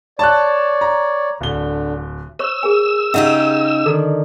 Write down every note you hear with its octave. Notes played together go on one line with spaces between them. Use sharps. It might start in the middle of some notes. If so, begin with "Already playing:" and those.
C#5 D5 A5 F#6
A#5
D1 D3 G7
C5 C#5 C#6 E6
G#4 A#4 G#5
C#3 D#4 G4 E5 F#5
D3 D#3 A4